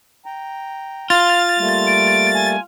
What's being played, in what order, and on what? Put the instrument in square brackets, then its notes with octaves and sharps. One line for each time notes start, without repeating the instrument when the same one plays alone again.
[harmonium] G5 A#5
[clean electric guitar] F4 [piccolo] F5 [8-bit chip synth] A6
[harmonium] G3 A3 A#3
[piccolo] D7
G#5